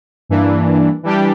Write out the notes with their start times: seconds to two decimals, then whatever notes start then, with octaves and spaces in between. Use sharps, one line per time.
0.29 G2 E3 A#3 D4
1.03 E3 G3 D4 G4